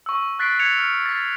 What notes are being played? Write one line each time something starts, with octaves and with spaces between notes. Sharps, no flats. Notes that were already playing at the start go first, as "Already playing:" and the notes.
C#6 E6
C#6 F#6 A6 B6 C7 D7
G#6 A6 C#7 F7
F6
A6 B6